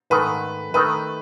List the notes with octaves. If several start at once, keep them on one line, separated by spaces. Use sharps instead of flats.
G#2 D#3 A3 D#4 A4 B4
D#3 A3 D#4 B4